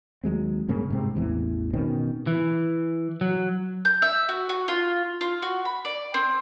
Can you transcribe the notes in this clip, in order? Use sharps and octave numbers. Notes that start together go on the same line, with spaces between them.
D#2 F#3 G#3 C4
G2 C#3 A#3 C#4
G#2 C3 C4
A1 E2 E3
B2 D#3 C4 C#4
E3
F#3
G6
E5
F#4
F#4
F4
F4
F#4
B5
D5
C4